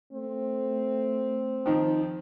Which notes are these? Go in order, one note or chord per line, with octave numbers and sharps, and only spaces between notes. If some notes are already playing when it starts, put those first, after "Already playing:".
A3 C4
D#3 F3 D#4 G5